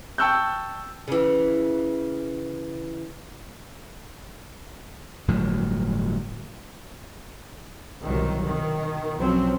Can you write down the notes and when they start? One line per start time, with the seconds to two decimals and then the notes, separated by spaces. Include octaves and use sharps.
0.18 G5 A5 C#6 E6 F#6 G6
1.08 C#3 E3
5.28 G1 A2 F3 F#3
8.03 C2 B2 D#3 F#3
8.44 B2 D#3
9.18 B1 F3 F#3 C4 C#4